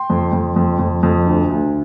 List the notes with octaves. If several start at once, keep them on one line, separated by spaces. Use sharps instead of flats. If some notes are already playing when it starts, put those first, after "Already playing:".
Already playing: G5 C6
F2
F2
F2
F2
F2
D2
D2